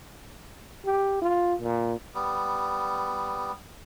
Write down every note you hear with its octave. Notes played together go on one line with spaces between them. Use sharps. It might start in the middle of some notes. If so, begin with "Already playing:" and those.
G4
F4
A#2
G3 B3